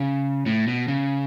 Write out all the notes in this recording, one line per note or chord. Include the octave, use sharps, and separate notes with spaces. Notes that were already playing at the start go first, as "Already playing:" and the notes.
Already playing: C#3
A2
B2
C#3